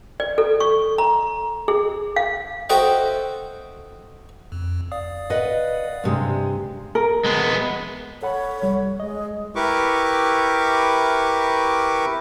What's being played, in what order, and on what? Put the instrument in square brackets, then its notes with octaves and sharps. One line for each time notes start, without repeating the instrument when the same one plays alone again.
[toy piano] D5
A4
C#6
A#5
G#4
F5
[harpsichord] F#4 A4 C5 D#5 E5 G5
[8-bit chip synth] F2
D5 F5 D#6
[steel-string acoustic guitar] B4 D#5 F#5
G2 C3 G#3
[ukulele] A#4
[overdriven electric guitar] G#3 B3
[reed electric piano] A4 F#5 B5 [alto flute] C#5
[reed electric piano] C2 G3
[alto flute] G#3 [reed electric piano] D#5
[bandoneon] E4 G4 A#4 B4 C#6 D6